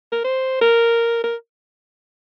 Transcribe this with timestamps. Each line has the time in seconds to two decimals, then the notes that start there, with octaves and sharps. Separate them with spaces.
0.12 A#4
0.25 C5
0.61 A#4
1.24 A#4